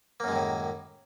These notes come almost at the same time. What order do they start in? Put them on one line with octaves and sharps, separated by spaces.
A#3 F#2 G#3 D#3 A2